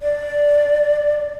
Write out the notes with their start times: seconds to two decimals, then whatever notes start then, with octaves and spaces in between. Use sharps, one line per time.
0.01 D5